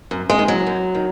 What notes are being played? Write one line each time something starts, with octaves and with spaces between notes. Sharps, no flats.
F#2
G#3
D#3
F#3
F#2
D#3